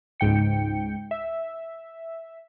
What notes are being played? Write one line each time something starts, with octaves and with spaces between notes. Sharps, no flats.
C#2 G#2 G5 C#7
E5